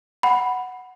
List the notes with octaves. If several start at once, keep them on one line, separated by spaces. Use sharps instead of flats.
F#5 B5